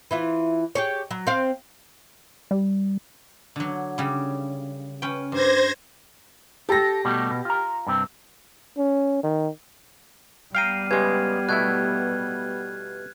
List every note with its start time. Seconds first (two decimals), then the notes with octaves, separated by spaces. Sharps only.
0.11 E3 E4 F4
0.75 G4 G#4 C#5
1.11 F#3
1.27 C4 F5
2.51 G3
3.56 D3 F#3
3.98 C#3 G3
5.02 C#4 B4 G5
5.32 G2 C5 G#6 A#6
6.69 G4 A4 A#6
7.05 B2 G3 A3
7.31 B2
7.45 F4 A#5
7.87 G2 C3 C4
8.77 C#4
9.23 D#3
10.55 G3 B3 F5 G5 A#5 F6 C7 D#7
10.91 C#3 G#3 G4 B4 G#6
11.49 B2 A3 E4 F#6 G#6